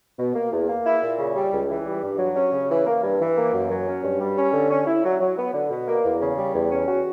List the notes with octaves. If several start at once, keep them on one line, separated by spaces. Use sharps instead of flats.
B2
A#3
E2
A#3
E4
A#2
C#3
G3
C#2
E3
G3
G2
F#3
C#4
C#3
E3
A#3
G2
E3
A#3
F#2
F#3
C#4
G2
G3
C#4
D3
C#4
E4
F#3
F#3
B3
D3
B2
A#3
E2
C#3
G3
E2
C#4
F#4